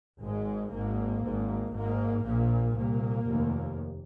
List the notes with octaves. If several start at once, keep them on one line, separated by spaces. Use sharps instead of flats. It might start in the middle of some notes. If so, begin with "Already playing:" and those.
G#1 G#2 G#3
G#1 G#2 A#3
G#1 G#2
G#1 G#2 A#3
A#1 A#2 A#3
C2 A#2 A#3
F1 D#2